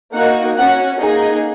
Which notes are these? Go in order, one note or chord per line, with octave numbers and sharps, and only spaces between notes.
A#3 D#4 F#4 F#5
C#4 F#4 F#5
A#3 D#4 G#4 D#5